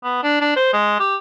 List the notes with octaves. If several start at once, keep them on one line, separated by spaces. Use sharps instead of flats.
B3
D4
D4
C5
G#3
G4